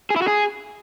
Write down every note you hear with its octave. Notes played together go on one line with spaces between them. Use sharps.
G#4
E4
F#4
G#4